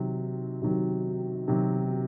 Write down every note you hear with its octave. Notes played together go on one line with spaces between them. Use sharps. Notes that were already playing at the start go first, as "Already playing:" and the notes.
Already playing: C3 D#3 F#3
C3 D#3 F#3
C3 D#3 F#3